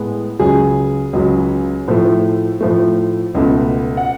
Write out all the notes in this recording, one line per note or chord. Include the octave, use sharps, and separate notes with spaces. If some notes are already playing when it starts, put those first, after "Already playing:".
Already playing: A2 G#3 B3
C#2 C#3 F#3 G#4
C#2 C#3 F#3
A2 F3 A3
A2 F3 A3
C#2 B2 A3
F#5